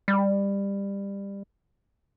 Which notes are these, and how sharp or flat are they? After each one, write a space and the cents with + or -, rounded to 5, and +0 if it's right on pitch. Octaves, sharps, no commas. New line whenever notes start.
G3 +20